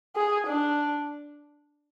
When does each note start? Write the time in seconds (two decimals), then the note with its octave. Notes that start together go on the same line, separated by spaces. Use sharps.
0.16 G#4
0.47 D4